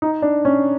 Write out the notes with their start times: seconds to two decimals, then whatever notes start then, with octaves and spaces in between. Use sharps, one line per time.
0.02 D#4
0.22 D4
0.45 C#4